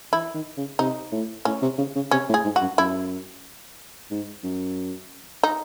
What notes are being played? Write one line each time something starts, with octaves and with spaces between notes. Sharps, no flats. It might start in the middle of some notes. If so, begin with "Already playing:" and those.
E3 E4
D#3
C#3
C3 D#4
A2
A2 C#4
C3
C#3
C#3
C3 C#4
A2
G#4
G#2
F#4
F#2
F#2 E4
G#2
F#2
D#4